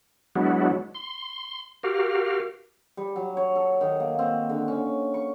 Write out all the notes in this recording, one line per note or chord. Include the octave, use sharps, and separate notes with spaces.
F#3 G#3 B3 D4 E4 F#4
C6
F#4 G4 A#4 F5
G3
F#3
C#5
A4
D#3
A#3
C4
D3
C#4
C#6